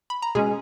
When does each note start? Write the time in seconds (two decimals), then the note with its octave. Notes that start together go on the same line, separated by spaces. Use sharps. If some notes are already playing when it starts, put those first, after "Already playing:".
0.10 B5
0.22 A#5
0.35 B2 G#3 C#4 G#4 G#5